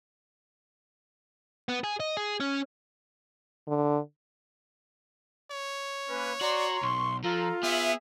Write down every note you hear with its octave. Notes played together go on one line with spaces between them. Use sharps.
B3
G#4
D#5
G#4
C#4
D3
C#5
A#3 C#4 B4
F#4 D5 A#5 C6
B1 C6 C#6
F3 F4 A4 A#5
B3 G#4 E5